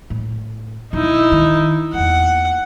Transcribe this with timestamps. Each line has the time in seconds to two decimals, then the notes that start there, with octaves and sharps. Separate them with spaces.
0.10 A2
0.93 D#2 B2 D#4 E4
1.32 D#3
1.93 E2 A#3 F#5